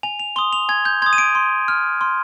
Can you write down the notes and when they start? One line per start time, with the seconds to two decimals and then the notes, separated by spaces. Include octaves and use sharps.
0.03 G#5 F7
0.19 F7
0.36 C6 D#6 G7
0.53 F7
0.69 G#5 G#6
0.85 G6
1.02 C6 G#6
1.06 D#6
1.13 D#7
1.18 D7
1.35 C6
1.68 F6
2.01 C6